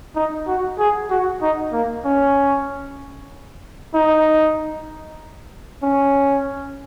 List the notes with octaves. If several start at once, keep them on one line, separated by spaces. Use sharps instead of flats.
D#4
F#4
G#4
F#4
D#4
A#3
C#4
D#4
C#4